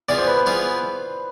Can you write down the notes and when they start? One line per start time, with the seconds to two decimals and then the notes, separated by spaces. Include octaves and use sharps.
0.08 E3 B3 F4 G#4 D5
0.18 C5
0.27 B4
0.46 E3 B3 F4 G#4